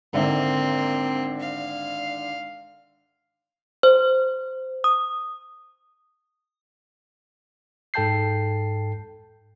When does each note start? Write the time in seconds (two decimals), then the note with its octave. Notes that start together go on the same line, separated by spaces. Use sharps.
0.13 G#1 D3 A#3 C4 E5
1.40 F5
3.83 C5
4.84 D#6
7.94 G#2 A4 G5 A5 G6 C7